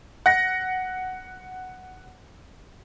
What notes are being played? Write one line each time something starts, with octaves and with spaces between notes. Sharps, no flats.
F#5 A#6